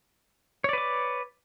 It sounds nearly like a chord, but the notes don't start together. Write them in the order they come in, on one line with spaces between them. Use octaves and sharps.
C#5 D5 B4 D6